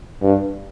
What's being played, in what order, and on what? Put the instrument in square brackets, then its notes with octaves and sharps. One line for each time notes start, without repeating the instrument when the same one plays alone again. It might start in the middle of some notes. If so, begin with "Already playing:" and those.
[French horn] G2